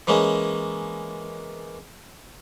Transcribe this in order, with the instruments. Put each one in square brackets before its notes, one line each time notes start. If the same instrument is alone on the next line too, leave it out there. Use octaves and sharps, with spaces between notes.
[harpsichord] E3 G#3 A#3 C#4